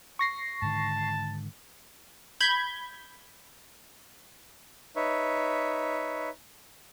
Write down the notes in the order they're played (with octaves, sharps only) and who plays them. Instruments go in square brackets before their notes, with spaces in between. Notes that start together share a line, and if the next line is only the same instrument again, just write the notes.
[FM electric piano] C#6 A#6 C7
[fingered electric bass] G#2 D3 D#3 [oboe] A5
[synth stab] B5 G6 G#6
[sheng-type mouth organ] D#4 B4 C#5 E5